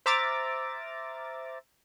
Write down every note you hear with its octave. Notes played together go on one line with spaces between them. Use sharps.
C5 E5 A#5 D6 F6 A6